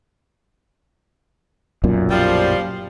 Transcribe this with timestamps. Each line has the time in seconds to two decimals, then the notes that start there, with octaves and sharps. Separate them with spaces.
1.84 B1 F#2 A#2
2.11 F3 G3